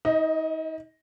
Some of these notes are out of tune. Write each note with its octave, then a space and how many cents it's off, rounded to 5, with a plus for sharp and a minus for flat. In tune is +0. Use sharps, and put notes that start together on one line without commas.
D#4 +40 D#5 +0